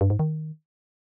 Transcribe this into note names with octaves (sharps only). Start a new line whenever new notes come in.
G2
G#2
D#3